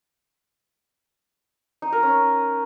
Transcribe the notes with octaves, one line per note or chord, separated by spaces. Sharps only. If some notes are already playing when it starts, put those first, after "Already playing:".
D#4
A#4
C#4